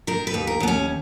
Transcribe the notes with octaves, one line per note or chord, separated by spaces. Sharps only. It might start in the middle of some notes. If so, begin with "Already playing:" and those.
D#3 A#4
B4
D#2
A#4
D#2 B3
C#4